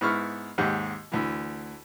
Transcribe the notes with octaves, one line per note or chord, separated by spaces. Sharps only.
G#2 B3 E4 C#6 F6
D#2 G#2 G4 F#5
D2 E3